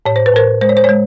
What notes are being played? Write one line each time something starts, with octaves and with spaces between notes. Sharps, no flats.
A2 C#5
C5
B4
A2 A#4 C5
G#3 C5
C#5
C5
C#5
G#3